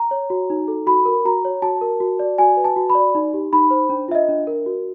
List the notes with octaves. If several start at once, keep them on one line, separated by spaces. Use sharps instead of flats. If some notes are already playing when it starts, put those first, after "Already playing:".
Already playing: A#5
C#5
F#4
D#4
A4
F#4 B5
A#4
F#4 A#5
C#5
F#4 A5
A#4
F#4
D5
F#4 G#5
B4
A5
F#4
B5
D5
D#4
G4
D#4 B5
C5
D4
F4 E5
D#5
D4
A#4
F#4